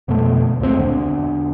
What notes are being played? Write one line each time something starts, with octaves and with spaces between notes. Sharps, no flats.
F2 B2 D3 A3
C#2 A#2 C4
E2 D3